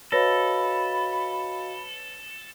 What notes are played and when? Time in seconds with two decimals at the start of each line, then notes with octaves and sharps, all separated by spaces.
0.12 F#4 A4 B4 C#5 D#5 F5 B5 A#6